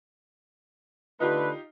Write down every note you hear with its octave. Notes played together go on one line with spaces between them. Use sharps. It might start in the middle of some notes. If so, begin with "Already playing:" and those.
D3 A3 D#4 F4 G4 B4